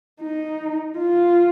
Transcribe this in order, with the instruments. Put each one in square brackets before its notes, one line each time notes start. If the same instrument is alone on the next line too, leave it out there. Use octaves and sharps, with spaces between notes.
[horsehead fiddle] D#4
F4